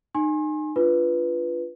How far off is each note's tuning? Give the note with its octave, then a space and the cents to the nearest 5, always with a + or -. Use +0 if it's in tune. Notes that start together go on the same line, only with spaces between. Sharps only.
D#4 -30 G#5 +0 C6 +40
D4 +0 F4 -5 B4 +0